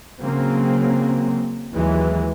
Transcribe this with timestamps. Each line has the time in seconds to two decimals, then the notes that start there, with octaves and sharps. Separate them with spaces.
0.21 C#3 F#3 A#3 C4
1.75 D#2 E3 F#3 G#3